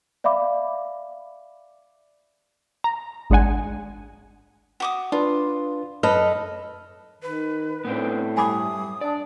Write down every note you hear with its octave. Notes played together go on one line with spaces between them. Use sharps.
D5 E5 F5 B5 D6
A#5
G#1 G#3 D4 F#5 G#5
F#4 D6 D#6
D4 F4 B4
F#2 A4 B4 D#5 F6
D#3 B4
A2 B3 C4 D4
G2 G#5 B5 D6 D#6
D4 D5